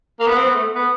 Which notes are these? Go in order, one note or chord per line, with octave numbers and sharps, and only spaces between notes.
A#3
B3
C4
B3
A3
B3